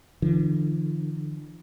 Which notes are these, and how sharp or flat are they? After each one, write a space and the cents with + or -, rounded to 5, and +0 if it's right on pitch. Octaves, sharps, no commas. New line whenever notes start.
D3 +30 F3 -45